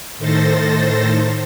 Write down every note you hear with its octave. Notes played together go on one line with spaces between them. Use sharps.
A2 D#3 A4 C5 A6 A#6